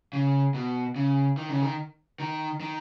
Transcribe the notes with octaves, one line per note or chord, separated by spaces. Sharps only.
C#3
B2
C#3
D#3
C#3
D#3
D#3
D#3